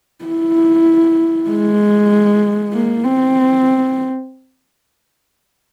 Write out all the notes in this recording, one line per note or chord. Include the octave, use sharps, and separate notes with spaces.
E4
G#3
A#3
C4